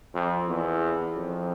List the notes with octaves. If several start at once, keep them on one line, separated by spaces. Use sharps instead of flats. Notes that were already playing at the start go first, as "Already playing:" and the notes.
F2
E2
F2